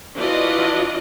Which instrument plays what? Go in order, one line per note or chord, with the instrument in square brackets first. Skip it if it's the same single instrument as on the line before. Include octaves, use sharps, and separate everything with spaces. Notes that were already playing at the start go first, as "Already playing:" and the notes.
[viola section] E3 D4 F4 F#4 D5 D#5